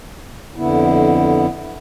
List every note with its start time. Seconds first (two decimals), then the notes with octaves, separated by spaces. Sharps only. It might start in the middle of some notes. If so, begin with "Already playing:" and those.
0.56 F2 D3 B3 E4